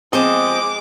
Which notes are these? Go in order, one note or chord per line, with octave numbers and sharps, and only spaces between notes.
F3 G#3 C4 D#5 D6